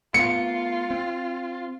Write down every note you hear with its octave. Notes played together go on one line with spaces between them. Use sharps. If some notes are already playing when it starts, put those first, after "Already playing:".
A3 B3 F4 C#7
C4